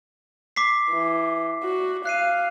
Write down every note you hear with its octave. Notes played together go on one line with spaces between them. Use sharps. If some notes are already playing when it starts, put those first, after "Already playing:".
D6 B6 C7
E3
F#4
F5 F#6 C7 D#7